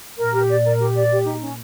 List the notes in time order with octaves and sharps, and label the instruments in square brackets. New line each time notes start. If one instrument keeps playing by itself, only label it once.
[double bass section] A#2 [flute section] A#4
[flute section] G4
D5
A#4
G4
D5
G4
D#4
C#4